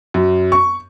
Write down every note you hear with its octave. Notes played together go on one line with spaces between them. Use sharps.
F#2
C#6